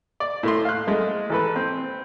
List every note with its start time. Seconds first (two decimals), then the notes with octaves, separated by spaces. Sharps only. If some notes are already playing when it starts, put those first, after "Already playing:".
0.20 D5
0.43 A2 A3 C6
0.65 F5 F#6
0.87 G#3 A3
1.30 A1 A4 B4
1.56 C4